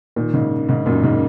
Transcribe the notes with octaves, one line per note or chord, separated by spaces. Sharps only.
A#2 D#3
G#2 C#3
G#2 C#3
F#2 A#2
G#2 C#3